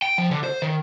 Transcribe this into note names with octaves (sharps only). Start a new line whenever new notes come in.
G5
F3
D3
C5
D#3